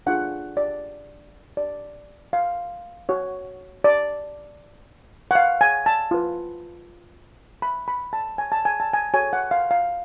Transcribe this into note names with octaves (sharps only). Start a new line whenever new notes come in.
D4 F4 G#4 F#5
D5
D5
F5
F#4 C#5
D5
F#5
F5
G#5
A5
F4 B4
B5
B5
A5
G#5
A5
G#5
A5
G#5
F#4 A4 C#5 G#5
F#5
F5
F5